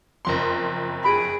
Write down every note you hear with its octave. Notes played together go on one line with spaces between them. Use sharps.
F#1 F2 C6
G#4 B5 D7